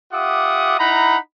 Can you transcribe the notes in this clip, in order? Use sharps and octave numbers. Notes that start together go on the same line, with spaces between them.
F4 G4 E5 F#5 D6 D#6
D#4 E4 F#5 A#5 B5